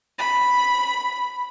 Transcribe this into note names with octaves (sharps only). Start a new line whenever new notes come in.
B5